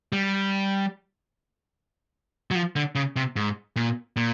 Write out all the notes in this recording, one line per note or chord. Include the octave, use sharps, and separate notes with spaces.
G3
F#3
F3
D3
C#3
C3
G#2
A#2
A#2